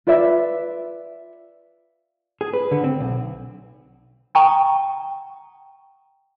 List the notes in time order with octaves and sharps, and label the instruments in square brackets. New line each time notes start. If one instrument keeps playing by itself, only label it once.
[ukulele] F4 B4 D5 E5
[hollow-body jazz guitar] G#4
B4
D3
C4
B1
[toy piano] F#5 G5 A5 A#5 C#6 D#6